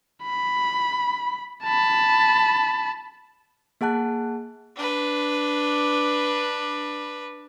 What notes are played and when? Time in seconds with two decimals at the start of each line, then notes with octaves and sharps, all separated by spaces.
0.23 B5
1.64 A5 B5
3.81 A#3 G#4 F#5 A5 F#6
4.76 D4 B4